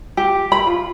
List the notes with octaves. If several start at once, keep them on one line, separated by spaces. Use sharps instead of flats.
G4
B5
F4